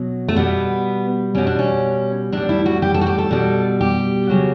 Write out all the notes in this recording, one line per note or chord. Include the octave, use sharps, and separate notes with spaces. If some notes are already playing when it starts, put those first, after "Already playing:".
Already playing: B2 F#3
A3
B2 G3 B3
B2 G3 C#4
D4
C#4
A2 G3 D4
E4
F#4
G4
A4
F#4
G4
A4
B2 G3
G4
C#3 F#3